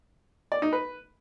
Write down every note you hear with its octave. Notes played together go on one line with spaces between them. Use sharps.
D5
D#4
B4